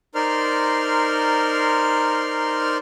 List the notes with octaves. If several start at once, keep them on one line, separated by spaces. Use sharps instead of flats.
D#4 A#4 C5 D5 C6 F6